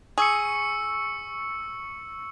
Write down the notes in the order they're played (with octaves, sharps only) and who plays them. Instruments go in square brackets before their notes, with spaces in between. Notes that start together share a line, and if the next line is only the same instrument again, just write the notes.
[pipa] G#4 [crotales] C#6 E6 C#7